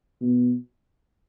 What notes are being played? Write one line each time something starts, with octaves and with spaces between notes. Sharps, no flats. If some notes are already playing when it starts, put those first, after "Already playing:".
B2